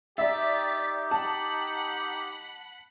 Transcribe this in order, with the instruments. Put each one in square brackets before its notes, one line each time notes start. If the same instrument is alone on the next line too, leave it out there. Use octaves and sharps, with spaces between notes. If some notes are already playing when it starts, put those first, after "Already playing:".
[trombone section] D#4 G4 [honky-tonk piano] D5 E5 [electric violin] A6 B6
[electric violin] F#5 B5 [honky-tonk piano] A5